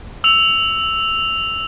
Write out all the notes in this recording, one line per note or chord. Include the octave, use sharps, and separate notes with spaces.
E6 F7